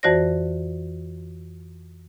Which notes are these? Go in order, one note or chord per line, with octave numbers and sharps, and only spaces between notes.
F2 E3 F#4 C5 D5 A#6